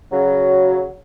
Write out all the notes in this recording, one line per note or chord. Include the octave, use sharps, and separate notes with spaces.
C#3 F#3